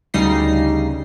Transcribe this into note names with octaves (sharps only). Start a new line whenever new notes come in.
D2 C#3 G3 D#4 A#6 C7